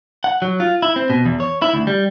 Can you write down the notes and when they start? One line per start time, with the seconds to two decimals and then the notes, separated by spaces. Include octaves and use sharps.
0.24 F#5
0.42 F#3
0.60 F4
0.82 E4
0.96 C4
1.10 B2
1.25 E2
1.40 C#5
1.62 E4
1.74 D2
1.87 G3